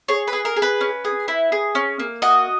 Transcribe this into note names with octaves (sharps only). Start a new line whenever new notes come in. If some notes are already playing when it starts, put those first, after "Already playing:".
G#4 C#5
B4
G#4
A#4
G#4
B4
C#4
G#4
E4
G#4
C#4
A#3
F#4 D#5